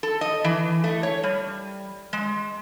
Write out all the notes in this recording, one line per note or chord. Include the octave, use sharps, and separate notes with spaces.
A4
D#5
E3
A3
C#5
G3
G#3